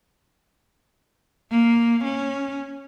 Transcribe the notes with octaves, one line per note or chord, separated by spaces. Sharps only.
A#3
C#4